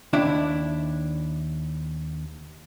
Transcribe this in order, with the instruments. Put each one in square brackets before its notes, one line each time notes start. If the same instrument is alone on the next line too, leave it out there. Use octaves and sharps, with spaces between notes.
[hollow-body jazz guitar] D#2 D4 E4